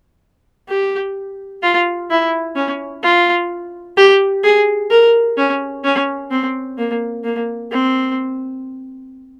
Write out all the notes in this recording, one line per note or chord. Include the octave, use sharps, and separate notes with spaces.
G4
F4
E4
C#4
F4
G4
G#4
A#4
C#4
C#4
C4
A#3
A#3
C4